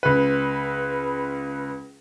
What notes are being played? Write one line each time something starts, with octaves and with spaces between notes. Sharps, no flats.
C#2 B4